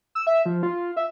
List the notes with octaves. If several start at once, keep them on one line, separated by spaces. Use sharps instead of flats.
E6
E5
F3
F4
E5